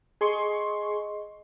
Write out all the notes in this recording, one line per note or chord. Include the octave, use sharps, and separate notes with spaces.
G#4 D#5 C6 C#6